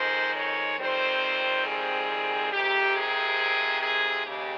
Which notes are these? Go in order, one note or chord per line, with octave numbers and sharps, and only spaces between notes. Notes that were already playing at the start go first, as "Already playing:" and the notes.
Already playing: F2 D#3 G#3 C5
C#5
F2 D#3 G3 C4 C5
G#4
F2 C3 D#3 G4
G#4
G#4
D#2 C#3 G4